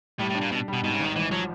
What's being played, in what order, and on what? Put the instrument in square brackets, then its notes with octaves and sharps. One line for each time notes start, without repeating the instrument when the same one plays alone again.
[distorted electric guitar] A2 [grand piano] G3
[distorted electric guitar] A2
[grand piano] D4
[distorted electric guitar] A#2
[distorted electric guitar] B2 [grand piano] D4
[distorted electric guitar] B2 [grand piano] G3
[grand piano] G#2 [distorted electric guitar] B2
[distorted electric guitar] C#3
[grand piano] G#1
[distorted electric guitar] D#3
[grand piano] G#1 [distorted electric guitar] E3
[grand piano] F3 [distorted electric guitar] F#3